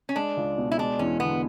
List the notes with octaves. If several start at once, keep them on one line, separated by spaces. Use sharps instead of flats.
C#4
G#3 D4
C#2
B2
E4
G#3 D4
E2 C#4
D3 B3